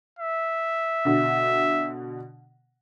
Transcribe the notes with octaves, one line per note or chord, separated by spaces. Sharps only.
E5
B2 D3